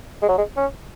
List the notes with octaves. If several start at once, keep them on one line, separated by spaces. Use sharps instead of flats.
G#3
F#3
G#3
C#4